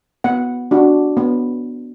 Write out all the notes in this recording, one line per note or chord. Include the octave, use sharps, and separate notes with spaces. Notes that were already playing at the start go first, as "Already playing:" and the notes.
B3 F#5
D4 F#4
B3